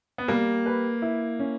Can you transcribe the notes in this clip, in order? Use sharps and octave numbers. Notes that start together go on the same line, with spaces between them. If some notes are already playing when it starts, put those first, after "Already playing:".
B3
G3 A#3
B4
E4
C#4